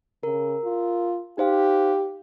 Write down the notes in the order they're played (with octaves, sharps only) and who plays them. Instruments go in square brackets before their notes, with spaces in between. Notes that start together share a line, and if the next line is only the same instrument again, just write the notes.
[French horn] C#3 [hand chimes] A#4
[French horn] F4
[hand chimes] D#4 C5 F5 [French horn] G4